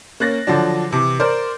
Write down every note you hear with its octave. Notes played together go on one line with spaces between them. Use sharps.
A#3 C#4 F#6 A6 A#6
D3 F3 F#3 D4
C3 E3
A#4 C5 D5